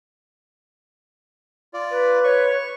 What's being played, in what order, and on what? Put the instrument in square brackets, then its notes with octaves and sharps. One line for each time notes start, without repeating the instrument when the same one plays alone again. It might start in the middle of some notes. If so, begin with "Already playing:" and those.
[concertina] F4 D5
[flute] B4
[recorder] C#5 [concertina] C#6